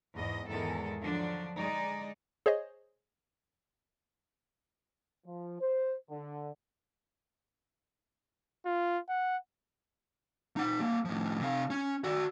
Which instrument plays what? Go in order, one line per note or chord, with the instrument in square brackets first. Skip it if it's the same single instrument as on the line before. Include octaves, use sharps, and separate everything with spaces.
[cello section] E2 G#2 D#5
E2 G#2 D#3 G#3 A4
D3 F3 F#3 D4
G#3 D#4 D5
[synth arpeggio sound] G#4 C5 C#5 D#5
[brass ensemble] F3
C5
D3
[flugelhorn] F4
F#5
[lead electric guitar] D#4 F#5
G3 A#3
A2 F3
C3 F5
C#4
F#4 D5